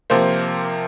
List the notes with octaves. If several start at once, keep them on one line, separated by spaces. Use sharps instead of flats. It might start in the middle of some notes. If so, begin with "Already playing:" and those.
C3 F3 A#3 C5